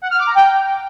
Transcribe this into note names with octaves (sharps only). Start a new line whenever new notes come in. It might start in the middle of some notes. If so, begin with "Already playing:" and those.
F#5
F6
D6
A#5
G5